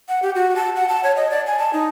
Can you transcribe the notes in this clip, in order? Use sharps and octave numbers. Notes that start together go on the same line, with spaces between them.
F#5
G4
F#4
A5
F#5
A5
C#5
D#5
D5
G#5
A5
D#4